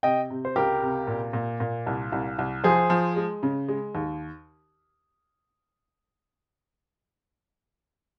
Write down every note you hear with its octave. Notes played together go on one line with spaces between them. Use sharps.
C3 D#5 G5
C3
C5
C#2 G4 A#4
C3
A#2
A#2
A#2
C2
C2
C2
F3 G#4 C5
F3
G#3
C#3
G#3
D#2